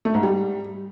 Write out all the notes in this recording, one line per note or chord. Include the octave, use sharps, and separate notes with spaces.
A3
G#2
G3